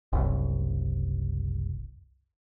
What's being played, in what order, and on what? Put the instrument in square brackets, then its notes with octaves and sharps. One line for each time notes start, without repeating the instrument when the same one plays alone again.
[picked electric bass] F#1 C2